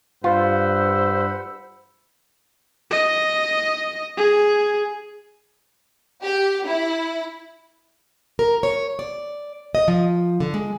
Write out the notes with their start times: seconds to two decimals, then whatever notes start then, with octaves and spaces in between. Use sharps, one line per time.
0.24 G2 F4 C5 F#5 B5 E6
2.91 D#5
4.17 G#4
6.23 G4
6.67 E4
8.39 A#4
8.63 C#5
8.99 D5
9.75 D#5
9.88 F3
10.40 D3
10.54 G#3